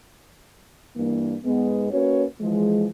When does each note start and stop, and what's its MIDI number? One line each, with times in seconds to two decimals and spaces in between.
0.96 1.36 43
0.96 1.36 52
0.96 1.36 58
1.45 1.88 44
1.45 1.88 56
1.45 1.88 59
1.92 2.25 58
1.92 2.25 61
1.92 2.25 66
1.92 2.25 71
1.92 2.25 73
2.41 2.87 52
2.41 2.87 53
2.41 2.87 56